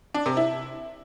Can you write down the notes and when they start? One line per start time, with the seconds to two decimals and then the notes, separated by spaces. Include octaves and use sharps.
0.14 D4
0.26 C3
0.37 E4